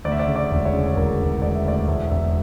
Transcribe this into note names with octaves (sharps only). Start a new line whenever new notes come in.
D2 D5
E5
D5
C#3
D5
E1
C#5
C#3
E1 A#4
E1
E1 D5
E5
D2 D5
E1 E5
E1 E5